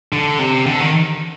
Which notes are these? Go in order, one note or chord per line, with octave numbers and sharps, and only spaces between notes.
D3
C3
D3
D#3